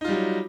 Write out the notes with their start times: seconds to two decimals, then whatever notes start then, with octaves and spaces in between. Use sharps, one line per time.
0.01 D#4
0.04 F4
0.08 G3
0.11 F#3